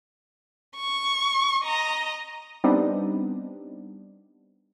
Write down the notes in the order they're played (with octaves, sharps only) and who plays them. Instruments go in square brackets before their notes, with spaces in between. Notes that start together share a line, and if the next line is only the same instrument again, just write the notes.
[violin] C#6
D#5 A#5
[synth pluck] G3 B3 C4 D4 D#4